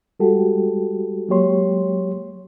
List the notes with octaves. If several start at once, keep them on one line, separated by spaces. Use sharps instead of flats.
G3 G#3 F#4 G4 A4
F#3 G#3 A#3 G4 C#5 C6